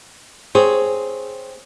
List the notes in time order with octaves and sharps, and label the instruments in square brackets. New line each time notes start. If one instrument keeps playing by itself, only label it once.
[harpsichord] C4 C5 C#5 [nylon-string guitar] G#4